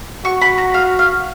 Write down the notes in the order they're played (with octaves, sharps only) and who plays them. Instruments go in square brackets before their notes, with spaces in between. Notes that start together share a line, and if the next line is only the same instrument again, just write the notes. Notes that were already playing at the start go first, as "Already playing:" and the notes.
[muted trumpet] F#4 [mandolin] C#6
[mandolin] B5
A#5
F5
F5